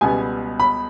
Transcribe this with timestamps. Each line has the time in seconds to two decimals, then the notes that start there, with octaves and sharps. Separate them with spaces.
0.01 C#2 B2 G3 B3 G#5
0.60 B5